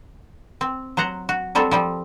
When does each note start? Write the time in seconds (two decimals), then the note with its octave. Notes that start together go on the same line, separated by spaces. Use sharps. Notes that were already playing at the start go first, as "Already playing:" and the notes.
0.61 C4
0.97 F#3 C5 F#5 A#5
1.29 F#4
1.55 F#3 G3 C4 A4 A#4
1.71 F3 G3 C4